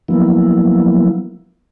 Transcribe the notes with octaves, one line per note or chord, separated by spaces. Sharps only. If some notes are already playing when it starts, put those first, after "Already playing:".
F3 F#3 A#3 B3 E4